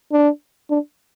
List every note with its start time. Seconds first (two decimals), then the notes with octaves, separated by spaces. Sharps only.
0.12 D4
0.70 D4